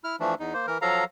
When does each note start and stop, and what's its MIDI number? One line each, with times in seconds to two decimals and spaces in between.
0.04 0.16 64
0.04 0.16 89
0.20 0.34 52
0.20 0.34 53
0.20 0.34 57
0.20 0.34 62
0.40 0.54 40
0.40 0.54 63
0.54 0.66 58
0.54 0.66 72
0.67 0.78 52
0.67 0.78 70
0.82 1.04 53
0.82 1.04 54
0.82 1.04 69
0.82 1.04 77
0.82 1.04 82